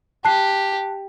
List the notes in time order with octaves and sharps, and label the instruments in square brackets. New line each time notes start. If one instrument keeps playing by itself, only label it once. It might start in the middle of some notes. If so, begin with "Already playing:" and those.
[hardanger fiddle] G4 [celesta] A5 F#6 C7